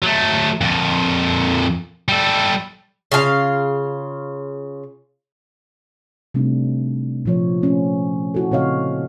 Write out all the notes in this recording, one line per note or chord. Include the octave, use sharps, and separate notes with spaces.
F#3 A3
F2 A#2
G3 A4
C#3 F4 G4 F5
C3 G3 A3 C4 D4 D#4
A#2 F3 C#5
A3 C#4
E4 F#4 A4
A#2 C#3 C4 C#5 D#5 F5